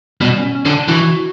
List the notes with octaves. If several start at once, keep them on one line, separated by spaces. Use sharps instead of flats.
B2 G3
C#4
C#4
D3 E4
D4
E3 F#4